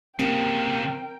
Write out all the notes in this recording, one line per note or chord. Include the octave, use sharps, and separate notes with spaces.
C#3 F3 A#3 C4 G4 A#4 G5